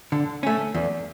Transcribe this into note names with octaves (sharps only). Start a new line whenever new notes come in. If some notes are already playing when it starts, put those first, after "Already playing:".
D3
A3 C#4
E2